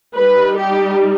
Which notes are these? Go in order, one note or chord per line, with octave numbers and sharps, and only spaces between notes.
G3 D#4 B4
G4